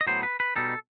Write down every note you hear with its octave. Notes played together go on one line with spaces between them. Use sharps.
D#5
A2 F#3 B3 C5
B4
B4
B2 G3 D#4 A4